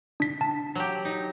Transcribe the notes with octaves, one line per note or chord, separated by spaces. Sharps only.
D4 B6
A5
F#3 G4
D#4